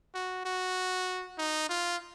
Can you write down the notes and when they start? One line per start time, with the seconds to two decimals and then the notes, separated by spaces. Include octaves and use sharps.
0.14 F#4
0.45 F#4
1.38 D#4
1.69 F4